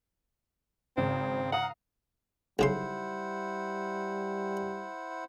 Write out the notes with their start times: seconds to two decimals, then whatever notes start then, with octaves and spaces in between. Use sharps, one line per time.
0.97 G#1 C#3 C4
1.52 F5 F#5 A#5 D#6
2.59 B1 C#3 G3 E4 C5 F#5 C6